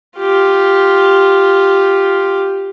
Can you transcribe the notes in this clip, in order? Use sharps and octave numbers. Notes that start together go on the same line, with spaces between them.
F4 G4